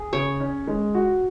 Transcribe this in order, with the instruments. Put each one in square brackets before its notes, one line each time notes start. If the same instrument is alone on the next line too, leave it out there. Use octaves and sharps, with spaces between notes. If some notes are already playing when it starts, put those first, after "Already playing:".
Already playing: [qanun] G#4
[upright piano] C#3 [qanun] C#5
[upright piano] C#4
G#3
F#4